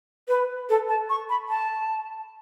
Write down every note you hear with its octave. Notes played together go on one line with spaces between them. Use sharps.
B4
A4
A5
C#6
B5
A5